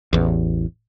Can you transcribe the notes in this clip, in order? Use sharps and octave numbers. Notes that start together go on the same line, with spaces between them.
A1 E2